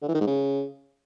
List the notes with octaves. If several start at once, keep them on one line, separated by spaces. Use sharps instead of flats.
D3
E3
D#3
G#2
C#3